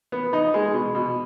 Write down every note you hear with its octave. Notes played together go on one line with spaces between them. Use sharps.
B3
D#4
G#3
B2
B2